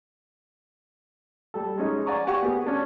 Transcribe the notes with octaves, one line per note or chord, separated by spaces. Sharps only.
G3 A4
G#3 C#4 D#4
D5 F#5 G#5 A#5 C#6
F#4 G4 F#5 G#5 C#6
B3 G#4
C#4 D4